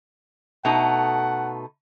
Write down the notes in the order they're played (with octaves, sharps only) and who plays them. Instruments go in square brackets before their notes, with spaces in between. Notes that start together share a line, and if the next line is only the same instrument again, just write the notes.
[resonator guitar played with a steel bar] B2 A3 D#4 [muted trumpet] F#5